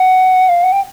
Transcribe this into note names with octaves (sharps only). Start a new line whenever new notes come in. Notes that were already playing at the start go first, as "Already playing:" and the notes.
Already playing: F#5
F5
F#5
G5